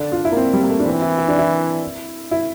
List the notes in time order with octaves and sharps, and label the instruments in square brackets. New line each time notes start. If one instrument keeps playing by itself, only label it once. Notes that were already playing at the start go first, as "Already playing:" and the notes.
Already playing: [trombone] D3 [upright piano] D4
[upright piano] F4
E4
A#3
C4
G3
A#3
A3
D4
[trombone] E3 [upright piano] C4
[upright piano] E4
E4
D4
E4
E4